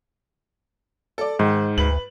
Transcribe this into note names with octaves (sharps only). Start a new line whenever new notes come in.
A4 D5
G#2 D#3
D2 B4 F#7